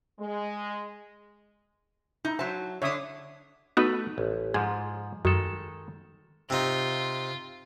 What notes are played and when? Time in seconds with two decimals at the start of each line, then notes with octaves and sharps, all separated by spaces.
0.20 G#3
2.25 D#4 E4
2.39 F#3 C5 E5 A5
2.82 D3 D4 C#5 E5 D#6
3.77 A3 B3 D#4 F#4 B4
4.18 A1
4.54 G#2 F3 G#4
5.25 F#2 D#3 G#3 A4
6.50 C3 D#4 F4